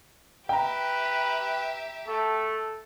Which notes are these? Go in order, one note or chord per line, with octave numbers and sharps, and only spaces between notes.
G4 B4 E5 G5 A#5
A3 A4